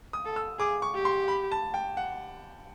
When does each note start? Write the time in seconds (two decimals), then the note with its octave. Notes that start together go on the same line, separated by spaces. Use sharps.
0.13 D#6
0.25 A4
0.36 E6
0.59 G#4 D6
0.82 C#6
0.94 G4
1.05 C6
1.28 B5
1.52 A5
1.74 G5
1.97 F#5